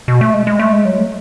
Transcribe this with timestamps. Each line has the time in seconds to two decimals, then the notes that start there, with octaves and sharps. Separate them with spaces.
0.08 B2
0.21 A3
0.34 G#3
0.47 G#3
0.59 A3
0.73 G#3
0.85 F#3
0.98 A3